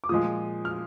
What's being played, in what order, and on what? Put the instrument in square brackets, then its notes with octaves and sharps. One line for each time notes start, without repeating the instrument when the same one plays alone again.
[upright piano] D6
A#2 F3 G#3 D#6
F6